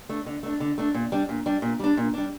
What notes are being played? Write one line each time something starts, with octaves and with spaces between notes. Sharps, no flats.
A3 D4
D3
A3 D4
D3
A3 D4
A#2
G3 D4
A#2
G3 D4
A#2
G3 D4
A#2
G3 D4